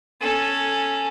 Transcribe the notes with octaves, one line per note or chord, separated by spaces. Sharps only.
C#4 A4